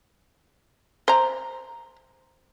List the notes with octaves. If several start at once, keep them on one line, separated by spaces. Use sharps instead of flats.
C5 A#5